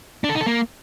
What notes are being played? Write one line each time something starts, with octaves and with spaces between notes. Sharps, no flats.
D4
A4
D#4
A4
A#3